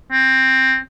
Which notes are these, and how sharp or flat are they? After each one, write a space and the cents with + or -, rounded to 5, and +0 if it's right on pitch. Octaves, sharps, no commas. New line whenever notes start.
C4 +10